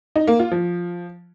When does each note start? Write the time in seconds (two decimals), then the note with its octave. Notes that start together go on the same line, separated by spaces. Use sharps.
0.16 D#4
0.28 A#3
0.39 F4
0.51 F3